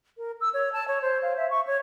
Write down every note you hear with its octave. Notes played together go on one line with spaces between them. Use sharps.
A#4
E6
C#5
A5
C#5
C5
F5
E5
C#6
C#5